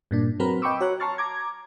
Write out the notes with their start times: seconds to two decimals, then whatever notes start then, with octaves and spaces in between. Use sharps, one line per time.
0.11 G2 A#2 D4
0.40 F#3 C4 A#4 B4
0.62 D#5 G5 B5 C#6 D6 E6
0.81 F#4 C#5 A#5 F#6
1.00 A5 A#5 C6 C#6 F6 A6
1.18 A#5 D6 G#6